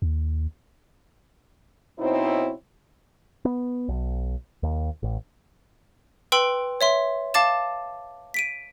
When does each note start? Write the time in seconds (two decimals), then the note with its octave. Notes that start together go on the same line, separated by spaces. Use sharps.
0.02 D#2
1.99 B2 C4 D#4 E4 C5 C#5
3.45 B3
3.88 B1
4.63 D#2
5.03 A1
6.32 B4 G5 C6 E6 D7 F#7
6.81 C#5 E5 C6
7.34 F5 A5 D6 A6 E7
8.34 B6 D7 D#7